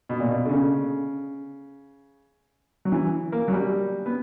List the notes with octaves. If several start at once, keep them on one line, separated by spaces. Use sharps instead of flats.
B2
A#2
B2
D3
C#3
F#3
E3
A#3
F#3
G3
B3